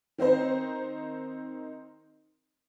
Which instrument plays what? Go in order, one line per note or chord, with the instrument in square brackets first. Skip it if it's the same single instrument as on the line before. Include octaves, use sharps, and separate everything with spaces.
[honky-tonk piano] D#3 C4 D#4 C5